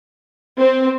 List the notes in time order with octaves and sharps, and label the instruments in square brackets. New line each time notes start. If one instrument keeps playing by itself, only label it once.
[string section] C4 [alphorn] C5